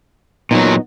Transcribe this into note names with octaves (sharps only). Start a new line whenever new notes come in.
A#2 F#3 B3 D#4